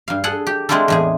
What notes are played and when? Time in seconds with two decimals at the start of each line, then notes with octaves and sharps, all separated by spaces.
0.08 G2 F5
0.24 G#4 A4 F#5
0.47 G4
0.69 G#3 C4 D4 E4 F4 A4
0.88 E2 A2 G#4